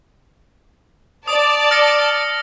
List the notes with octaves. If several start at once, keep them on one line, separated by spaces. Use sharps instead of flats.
D5 A5 D#6
F6 A#6 C#7